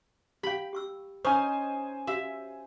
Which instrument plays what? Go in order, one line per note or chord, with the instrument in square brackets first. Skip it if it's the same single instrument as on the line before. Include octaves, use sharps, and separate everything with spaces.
[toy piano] G4 F5 [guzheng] G5 B5
[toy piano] G4 C#6 E6
[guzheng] C#4 D#4 [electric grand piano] C5 G#5 [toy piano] D#6
[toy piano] F#4 G4 F5 [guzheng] E5